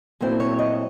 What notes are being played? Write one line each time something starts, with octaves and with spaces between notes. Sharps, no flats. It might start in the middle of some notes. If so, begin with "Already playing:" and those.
A#2 F#3 A3 C4 E4
C#5
D#5